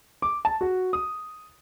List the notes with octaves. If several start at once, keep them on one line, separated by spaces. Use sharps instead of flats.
D6
A5
F#4
D#6